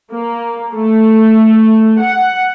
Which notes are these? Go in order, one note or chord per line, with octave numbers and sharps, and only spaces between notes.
A#3
A3
F#5